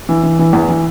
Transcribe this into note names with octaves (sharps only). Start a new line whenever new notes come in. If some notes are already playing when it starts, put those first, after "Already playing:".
E3
E3
E3
E2
E3